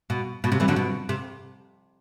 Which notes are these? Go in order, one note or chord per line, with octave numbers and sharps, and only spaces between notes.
B2
B2
C3
E3 G3
D3 F#3
B2
C3